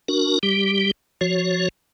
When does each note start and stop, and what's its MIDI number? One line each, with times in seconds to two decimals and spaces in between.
0.08 0.39 62
0.08 0.39 66
0.08 0.39 70
0.43 0.91 55
0.43 0.91 67
1.21 1.69 53
1.21 1.69 66
1.21 1.69 73